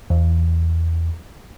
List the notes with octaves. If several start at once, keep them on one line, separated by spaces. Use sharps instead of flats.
E2